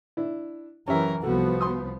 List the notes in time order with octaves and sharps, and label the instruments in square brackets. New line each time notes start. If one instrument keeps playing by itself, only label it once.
[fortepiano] D4 E4
[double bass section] F#2 E3 [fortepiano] C#4 G4 E5 [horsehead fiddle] A#4
[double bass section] C2 F3 B3 [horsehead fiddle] F#4 [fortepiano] A4
[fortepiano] C6 D#6